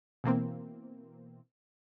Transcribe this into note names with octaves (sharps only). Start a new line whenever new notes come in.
B2 E3 A#3 C4